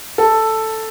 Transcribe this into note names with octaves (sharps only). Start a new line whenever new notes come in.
A4